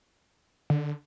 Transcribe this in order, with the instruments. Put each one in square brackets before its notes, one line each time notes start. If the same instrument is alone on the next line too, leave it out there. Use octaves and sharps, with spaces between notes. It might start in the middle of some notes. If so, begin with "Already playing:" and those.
[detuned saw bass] D3